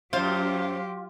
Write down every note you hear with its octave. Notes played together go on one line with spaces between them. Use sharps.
F#2 F#3 F4 G4 C5